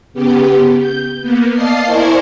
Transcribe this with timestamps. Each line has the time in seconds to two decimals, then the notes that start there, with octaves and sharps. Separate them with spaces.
0.13 C#3 B3 G4
0.80 G6
1.21 A#3 B3
1.53 D5 D#5 F5 A5 C7
1.85 E4 A#4 C5 D5 G#5 C#6